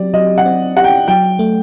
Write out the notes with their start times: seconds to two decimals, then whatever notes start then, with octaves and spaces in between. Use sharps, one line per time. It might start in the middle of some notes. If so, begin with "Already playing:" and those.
Already playing: F#3 C4 G4 D5
0.14 F#3 D#5
0.38 F#5
0.45 C4
0.77 G4 F#5
0.84 G5
1.07 F#3 G5
1.39 A3